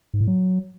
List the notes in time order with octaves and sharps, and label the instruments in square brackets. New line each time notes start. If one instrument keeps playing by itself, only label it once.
[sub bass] G#2
A2
F#3